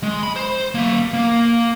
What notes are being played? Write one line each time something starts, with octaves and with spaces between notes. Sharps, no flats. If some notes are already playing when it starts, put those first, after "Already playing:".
G#3
B5
C5
A#3 E5
A#3